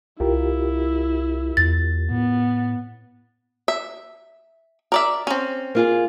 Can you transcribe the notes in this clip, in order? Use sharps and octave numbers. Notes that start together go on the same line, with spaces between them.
C2 E4 F4 G4 A#4
E2 A6
A2 B3
E5
A#4 D5 E5
C4 C#4
A#3 F4 G#4